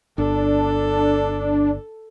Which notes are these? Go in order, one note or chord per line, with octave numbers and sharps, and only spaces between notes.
G1 D4 A4